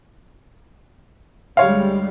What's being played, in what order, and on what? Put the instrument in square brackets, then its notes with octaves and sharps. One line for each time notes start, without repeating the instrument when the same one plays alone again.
[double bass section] D2 G3 G#3 [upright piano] C#5 F5